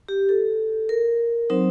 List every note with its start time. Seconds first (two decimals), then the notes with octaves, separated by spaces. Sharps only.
0.09 G4
0.29 A4
0.89 A#4
1.50 F#3 C4 D#4 C5